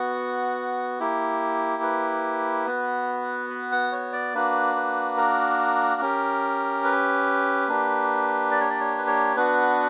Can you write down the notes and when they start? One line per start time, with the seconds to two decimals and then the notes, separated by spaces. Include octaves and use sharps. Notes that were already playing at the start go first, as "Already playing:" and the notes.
Already playing: B3 F#4
1.00 A#3 E4 G4
1.83 B4
2.66 B3 F#4
3.50 B4
3.72 F#5
3.92 C#5
4.13 D5
4.34 A#3 D4 F#4 B4
4.75 B4
5.17 A#4
6.01 C#4 G4
6.84 B4
7.68 A#3 D4 G4
8.51 D5
8.60 C#5
8.70 D5
8.80 C#5
8.98 B4
9.07 C#5
9.36 B3 D4 F#4 B4